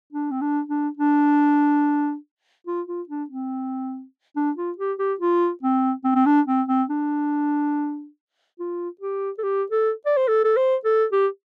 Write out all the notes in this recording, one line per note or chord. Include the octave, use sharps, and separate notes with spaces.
D4
C4
D4
D4
D4
F4
F4
D4
C4
D4
F4
G4
G4
F4
C4
C4
C4
D4
C4
C4
D4
F4
G4
A4
G4
A4
D5
C5
A4
A4
C5
A4
G4